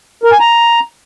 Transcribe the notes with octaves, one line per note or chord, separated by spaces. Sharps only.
A#4
G#5
A#5